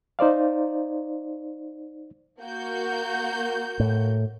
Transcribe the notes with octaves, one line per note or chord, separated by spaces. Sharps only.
D#4 C5 D5 F5
A#3 F#4 G6
A2